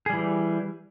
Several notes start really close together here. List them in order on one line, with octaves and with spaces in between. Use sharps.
G#4 G3 E3